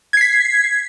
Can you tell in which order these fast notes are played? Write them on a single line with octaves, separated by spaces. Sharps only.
G#6 C7 B6